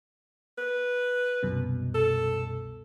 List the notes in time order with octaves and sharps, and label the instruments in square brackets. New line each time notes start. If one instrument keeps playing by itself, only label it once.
[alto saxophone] B4
[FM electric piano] C2 F#2 B2
[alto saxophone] A4